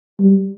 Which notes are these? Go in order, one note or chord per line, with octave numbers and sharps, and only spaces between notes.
G3